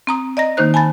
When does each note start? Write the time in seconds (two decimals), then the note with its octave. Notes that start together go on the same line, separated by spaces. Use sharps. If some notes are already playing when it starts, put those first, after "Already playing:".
0.07 C4 A#5 D#6
0.37 D5 D#5 A#5 A#6
0.57 D#3 A#3 D#4 C5 F#6
0.74 G#5 A5 B5 A6